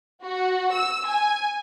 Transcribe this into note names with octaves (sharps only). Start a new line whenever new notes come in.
F#4
E6
G#5